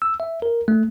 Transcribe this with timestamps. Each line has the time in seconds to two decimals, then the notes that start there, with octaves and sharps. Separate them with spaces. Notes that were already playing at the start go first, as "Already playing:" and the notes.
0.02 E6
0.20 E5
0.42 A#4
0.68 A3